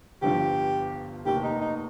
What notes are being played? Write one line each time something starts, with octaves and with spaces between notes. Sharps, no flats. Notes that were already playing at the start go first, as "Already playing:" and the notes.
G1 G2 F3 G4
F1 D#2 D#3 G4
D#4
D#4